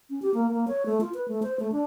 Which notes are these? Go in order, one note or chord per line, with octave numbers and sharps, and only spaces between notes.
C#4
G4
A#3
A#3
C#5
A3
F4
B4
A3
C5
A3
D4